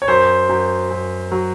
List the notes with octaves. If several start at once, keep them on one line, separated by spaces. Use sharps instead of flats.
C#5
F#2 C5
F#2
F#2
F#3